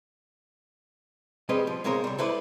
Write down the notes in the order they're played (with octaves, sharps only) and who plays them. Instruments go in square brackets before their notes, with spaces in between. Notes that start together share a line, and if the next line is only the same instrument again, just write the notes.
[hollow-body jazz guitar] G3 G#3 C4 B4 D#5
F3
B1 G#3 C4 A#4 C#5
C#3 G3
E4 A4 B4 C5 D5